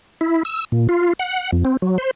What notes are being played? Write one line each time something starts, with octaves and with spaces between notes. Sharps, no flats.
E4
E6
A#2
F4
F#5
F2
C4
F#3
C5